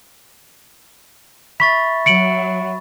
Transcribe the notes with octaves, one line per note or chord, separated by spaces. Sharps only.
E5 B5 C#6 A6 B6
F#3 C#7 D7 F#7